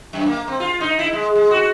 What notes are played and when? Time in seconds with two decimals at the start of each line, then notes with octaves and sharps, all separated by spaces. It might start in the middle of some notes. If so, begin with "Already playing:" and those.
0.13 F#2
0.26 A#3
0.48 C4
0.60 F4
0.80 D#4
0.99 E4
1.13 G#3
1.35 G#3
1.51 F#4